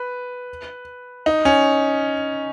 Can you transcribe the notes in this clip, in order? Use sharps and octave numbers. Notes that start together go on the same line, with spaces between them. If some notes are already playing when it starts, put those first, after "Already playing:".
Already playing: B4
D#4
C#4